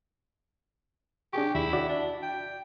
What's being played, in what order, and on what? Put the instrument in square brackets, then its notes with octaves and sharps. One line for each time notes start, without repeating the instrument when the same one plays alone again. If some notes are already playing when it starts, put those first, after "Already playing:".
[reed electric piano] D4 G#4 C#6 [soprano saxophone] G4
[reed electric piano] D#2 [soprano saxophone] E4
[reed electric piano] F#4 D5
[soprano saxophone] D4
G5